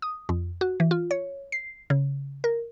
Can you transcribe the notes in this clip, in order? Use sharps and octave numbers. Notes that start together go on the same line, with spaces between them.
D#6
F2
F#4
E3
F4
C#5
C7
C#3
A#4